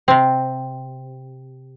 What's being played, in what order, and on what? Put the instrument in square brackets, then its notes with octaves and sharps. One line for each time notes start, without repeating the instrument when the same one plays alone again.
[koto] C3 C4